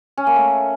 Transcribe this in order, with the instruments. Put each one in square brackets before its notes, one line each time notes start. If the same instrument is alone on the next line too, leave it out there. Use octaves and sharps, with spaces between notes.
[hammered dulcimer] C#4
A#3
A3